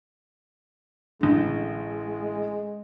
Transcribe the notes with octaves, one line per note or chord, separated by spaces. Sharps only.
A1 D3 G#3